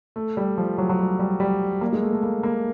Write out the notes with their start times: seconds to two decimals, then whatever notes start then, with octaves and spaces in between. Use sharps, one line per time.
0.16 A3
0.37 G3
0.58 F3
0.78 F#3
0.89 F#3
0.99 G3
1.19 G3
1.40 G3
1.81 A#3
1.93 G#3
2.03 A3
2.13 A3
2.23 A#3
2.43 A#3